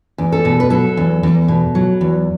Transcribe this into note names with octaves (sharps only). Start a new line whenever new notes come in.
E2
A4
B2
B4
F#3 A4
E2
E2
B2
F#3
E2